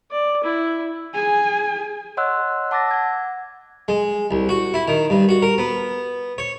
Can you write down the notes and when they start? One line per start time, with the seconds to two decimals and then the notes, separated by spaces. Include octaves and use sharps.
0.11 D5
0.43 E4
1.14 G#4 G#5
2.17 C#5 D#5 F#5 C6 E6 F#6
2.71 F#5 A5 D6 E6 A6 A#6
2.91 F#5 G#6
3.88 G#3
4.31 C2
4.49 F#4
4.74 E4
4.88 D#3
5.10 G2
5.29 F#4
5.43 A#4
5.58 B3
6.38 C#5